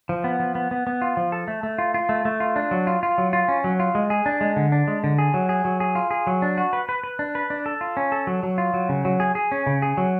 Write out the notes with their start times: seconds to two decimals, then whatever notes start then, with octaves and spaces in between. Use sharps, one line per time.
0.09 F3
0.24 B3
0.40 F3
0.55 B3
0.71 B3
0.87 B3
1.02 F4
1.17 F3
1.32 A4
1.48 A3
1.63 A3
1.78 F4
1.94 F4
2.09 A3
2.25 A3
2.40 F4
2.56 D4
2.71 F#3
2.87 F4
3.03 F4
3.18 F#3
3.33 F4
3.48 C#4
3.64 F#3
3.80 F4
3.95 G#3
4.10 G#4
4.26 D4
4.41 G#3
4.56 D3
4.72 D4
4.88 G#3
5.04 D3
5.18 G#4
5.34 F#3
5.49 G#4
5.65 F#3
5.80 G#4
5.95 F4
6.11 G#4
6.27 F#3
6.42 D4
6.58 F#4
6.73 B4
6.89 B4
7.04 B4
7.19 D4
7.35 B4
7.50 D4
7.66 A4
7.81 F4
7.97 C#4
8.12 A4
8.27 F#3
8.43 F#3
8.58 F4
8.74 F#3
8.89 C#3
9.05 F#3
9.20 G#4
9.35 G#4
9.52 C#4
9.67 C#3
9.82 G#4
9.97 F#3